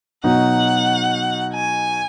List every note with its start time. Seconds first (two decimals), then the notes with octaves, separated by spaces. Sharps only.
0.24 B2 F#3 D#4 F#4 F#5
1.54 G#5